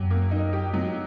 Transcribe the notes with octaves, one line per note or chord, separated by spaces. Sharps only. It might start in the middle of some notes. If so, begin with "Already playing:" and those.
Already playing: F#2 F#3 G4
A#3
D#4
G4
F#3